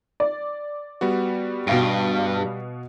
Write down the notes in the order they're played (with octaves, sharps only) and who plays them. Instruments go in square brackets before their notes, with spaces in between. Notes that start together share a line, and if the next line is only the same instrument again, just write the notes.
[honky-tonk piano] D5
[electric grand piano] G3 B3 F#4
[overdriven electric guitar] G2 [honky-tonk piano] B2 F5 D7